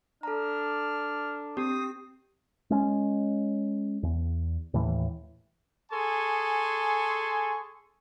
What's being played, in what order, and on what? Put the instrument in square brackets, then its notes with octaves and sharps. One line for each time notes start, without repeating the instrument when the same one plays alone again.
[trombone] D4 [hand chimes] A4 A#5 [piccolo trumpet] F6
[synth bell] C4 [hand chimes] G4 [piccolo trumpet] D#6
[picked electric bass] G#3 C#4
E2
D#2 A2 E3
[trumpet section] G#4 A4 G#5 C6 C#6